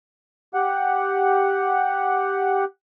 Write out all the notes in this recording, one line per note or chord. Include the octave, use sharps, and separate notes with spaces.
G4 F#5